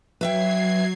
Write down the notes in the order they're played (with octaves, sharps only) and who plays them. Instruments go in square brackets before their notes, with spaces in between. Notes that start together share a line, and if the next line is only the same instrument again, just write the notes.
[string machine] F#3 G#6 C7 [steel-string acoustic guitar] B4 E5 G5